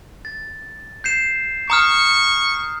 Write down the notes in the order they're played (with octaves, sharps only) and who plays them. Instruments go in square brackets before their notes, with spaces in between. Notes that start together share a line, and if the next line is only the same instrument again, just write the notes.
[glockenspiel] A6
G6 C7 E7
[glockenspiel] A#5 D#6 F6 [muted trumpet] C#6